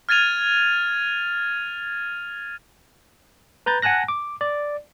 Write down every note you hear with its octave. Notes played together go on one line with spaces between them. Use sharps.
F6 G#6 A6 D#7 F7
B4 A#5 G6 A6
F#5 G#5 A5 F#6 A#6
D6
D5